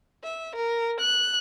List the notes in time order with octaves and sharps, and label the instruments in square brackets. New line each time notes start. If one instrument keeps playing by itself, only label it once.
[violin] E5
A#4
F#6